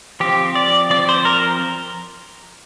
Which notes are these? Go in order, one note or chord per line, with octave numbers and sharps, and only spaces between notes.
F3 C4 G4
D5
F3 C4 D5
C5
A#4